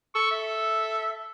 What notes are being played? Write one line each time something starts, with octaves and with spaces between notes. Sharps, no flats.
A4 C#6
E5